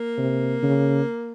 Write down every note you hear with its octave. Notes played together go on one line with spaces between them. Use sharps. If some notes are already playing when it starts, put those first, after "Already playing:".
Already playing: A#3
C3
C#3